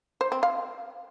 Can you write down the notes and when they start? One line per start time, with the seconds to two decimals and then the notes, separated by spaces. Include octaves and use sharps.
0.21 C5
0.32 C4
0.43 F5